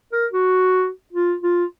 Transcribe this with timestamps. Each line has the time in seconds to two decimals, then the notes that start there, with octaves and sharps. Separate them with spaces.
0.12 A#4
0.32 F#4
1.13 F4
1.43 F4